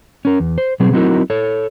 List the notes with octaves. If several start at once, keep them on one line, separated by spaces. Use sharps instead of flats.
C#4 A#4
E2
C5
B2 F#3 C4 G#4
F#3 C4 D#4 E4 F#4 A#4
A4 C#5